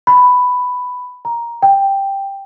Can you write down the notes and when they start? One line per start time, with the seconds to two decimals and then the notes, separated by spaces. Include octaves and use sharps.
0.07 B5
1.25 A#5
1.63 G5